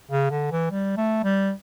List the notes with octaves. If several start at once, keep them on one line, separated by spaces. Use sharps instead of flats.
C#3
D3
E3
G3
A3
G3